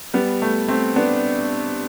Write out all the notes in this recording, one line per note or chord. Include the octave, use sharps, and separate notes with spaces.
G3 B3
A3
A3 C4
B3 D4